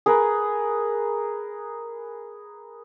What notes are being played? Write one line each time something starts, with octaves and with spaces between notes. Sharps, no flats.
G#4 A#4 B4